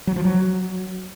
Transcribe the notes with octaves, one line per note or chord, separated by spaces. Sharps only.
F#3
F3
F#3